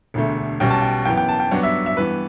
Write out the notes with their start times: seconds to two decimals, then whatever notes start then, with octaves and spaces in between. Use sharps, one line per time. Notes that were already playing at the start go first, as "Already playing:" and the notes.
0.14 E1 D2 D3 A3
0.60 B1 B2 G3 C#4 G5
0.70 A5
0.82 G5
1.05 F#2 E3 B3 G5
1.17 G5
1.28 A5
1.40 G5
1.51 G2 F#3 B3 D4 F#5
1.63 E5
1.86 E5
1.97 G2 E3 B3 B4